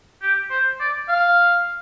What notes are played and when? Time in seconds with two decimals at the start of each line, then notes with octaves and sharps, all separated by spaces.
0.22 G4
0.51 C5
0.80 D5
1.09 F5